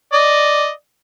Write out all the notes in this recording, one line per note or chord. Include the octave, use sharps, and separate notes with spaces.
D5 D#5